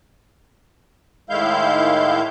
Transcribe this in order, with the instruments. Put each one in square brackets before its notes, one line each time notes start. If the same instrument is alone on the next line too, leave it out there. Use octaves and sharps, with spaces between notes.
[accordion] A2 D#3 G#3 E4 F5 G6